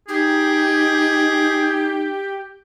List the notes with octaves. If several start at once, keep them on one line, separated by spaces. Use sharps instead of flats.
D#4 G4 G#4